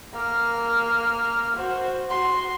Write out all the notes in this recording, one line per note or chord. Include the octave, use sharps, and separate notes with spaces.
A#3 F6
F#4 C5
F#4 C6